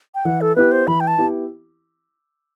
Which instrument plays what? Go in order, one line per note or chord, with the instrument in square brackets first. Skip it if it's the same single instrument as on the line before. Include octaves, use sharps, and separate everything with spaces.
[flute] G5
[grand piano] E3 [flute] F#5
[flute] A4
[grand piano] B3 E4 G4 [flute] B4
[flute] C5
[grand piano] E3 [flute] B5
[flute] G5
A5
[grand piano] B3 E4 G4